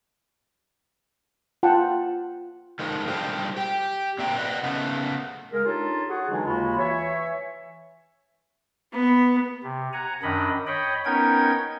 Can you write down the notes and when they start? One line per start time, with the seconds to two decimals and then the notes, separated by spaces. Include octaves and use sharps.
1.63 F4 F#5 G5 A5
2.79 D#3 F3 G#3 A3
3.07 G3 D4 F4 G4 A4 C5
3.56 G4 G5
4.18 A#2 D3 C4 E5 G5 A#5
4.37 B4 D5 D#5 F#5
4.63 C#3 A3 B3
5.52 C#3 G#3 G#4 A#4
5.65 D4 D#4 F4 G4 A4 C#5
6.09 F#4 G#4 F#5
6.30 D3 E3 F#3 G#3 D4 D#4
6.46 D#2 C#3 G#3 F4 F#4 B5
6.78 E3 C#5 E5
8.92 B3
9.63 C3
9.93 F#5 G#5 A#5
10.23 F#2 D#3 D4 D#5 B5
10.67 C#5 D#5 G5 B5
11.05 B3 C#4 D#4 A#4 G5 G#6